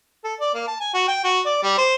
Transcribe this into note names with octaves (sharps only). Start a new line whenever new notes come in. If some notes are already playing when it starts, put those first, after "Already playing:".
A4
D5
A#3
A5
G#5
F#4
G5
F#4
D5
G3
C5